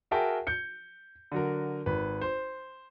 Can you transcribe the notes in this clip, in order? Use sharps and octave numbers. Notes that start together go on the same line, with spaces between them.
F#4 G#4 A#4 E5 G5 A5
G6 C#7
D3 F#3 A#4
G#1 B4
C5